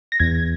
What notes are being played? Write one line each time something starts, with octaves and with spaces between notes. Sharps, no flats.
A#6
E2 G#6